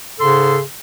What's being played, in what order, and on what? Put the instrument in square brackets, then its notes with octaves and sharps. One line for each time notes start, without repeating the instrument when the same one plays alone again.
[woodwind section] G#2 C#3 A4 C6